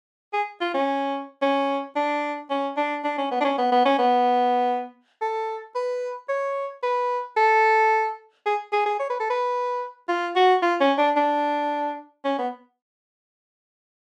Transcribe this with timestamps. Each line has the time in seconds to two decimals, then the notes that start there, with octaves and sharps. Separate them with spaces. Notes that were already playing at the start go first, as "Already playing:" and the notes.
0.33 G#4
0.61 F4
0.74 C#4
1.42 C#4
1.96 D4
2.51 C#4
2.77 D4
3.04 D4
3.18 C#4
3.31 B3
3.41 D4
3.45 C#4
3.58 B3
3.72 B3
3.86 C#4
3.99 B3
5.22 A4
5.76 B4
6.29 C#5
6.83 B4
7.37 A4
8.46 G#4
8.73 G#4
8.86 G#4
9.00 C#5
9.10 B4
9.20 A4
9.30 B4
10.09 F4
10.36 F#4
10.63 F4
10.80 C#4
10.98 D4
11.17 D4
12.25 C#4
12.38 B3